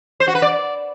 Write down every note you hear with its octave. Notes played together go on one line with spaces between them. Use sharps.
C5
F#4
B4
D5